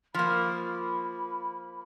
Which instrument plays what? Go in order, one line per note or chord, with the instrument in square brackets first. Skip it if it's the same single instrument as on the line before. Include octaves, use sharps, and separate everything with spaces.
[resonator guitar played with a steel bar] F3 A#3 [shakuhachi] B5